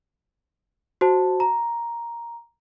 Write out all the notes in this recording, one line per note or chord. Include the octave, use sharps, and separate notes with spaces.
F#4 C5 A5
A#5